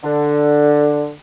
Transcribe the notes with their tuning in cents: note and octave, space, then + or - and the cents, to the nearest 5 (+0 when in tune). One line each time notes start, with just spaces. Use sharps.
D3 +5